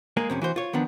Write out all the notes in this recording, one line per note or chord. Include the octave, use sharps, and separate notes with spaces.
G#3 A#3 G#4
F2 C3 C#4
E3 F#4 C5
F4 C#5
D#3 F3 B3 D4